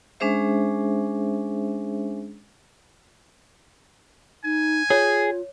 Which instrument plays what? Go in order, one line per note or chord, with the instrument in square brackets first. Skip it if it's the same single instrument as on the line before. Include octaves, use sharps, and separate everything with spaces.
[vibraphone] G#3 C#4 D4 G#4 C5 E5
[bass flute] D#4 [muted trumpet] G#5
[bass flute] F4 [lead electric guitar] G#4 [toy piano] C#5